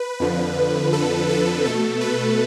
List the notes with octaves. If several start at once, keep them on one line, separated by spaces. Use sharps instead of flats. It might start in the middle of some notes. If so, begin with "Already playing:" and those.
Already playing: B4
F2 D3 F3
A4
A4
B2 A3 A4
B4